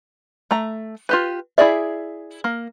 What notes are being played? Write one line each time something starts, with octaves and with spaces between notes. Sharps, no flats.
A3 A#5
F4 G4 B4
E4 F#4 G#4 D5 E5
A#3